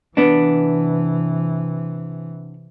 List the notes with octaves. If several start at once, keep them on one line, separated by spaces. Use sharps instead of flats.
C3 E3 B3 D4